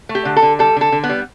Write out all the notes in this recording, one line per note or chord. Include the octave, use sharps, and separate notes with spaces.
A3
G4
D3
A4
D3
G3 A4
D3 A4
D3
B3
G3